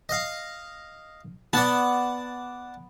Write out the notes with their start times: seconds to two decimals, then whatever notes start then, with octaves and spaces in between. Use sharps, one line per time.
0.09 D#5 F5
1.53 B3 D5 F#5 A5